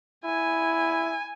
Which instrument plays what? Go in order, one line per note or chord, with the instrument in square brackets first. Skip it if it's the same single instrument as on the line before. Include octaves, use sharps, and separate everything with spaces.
[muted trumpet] E4 [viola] G#5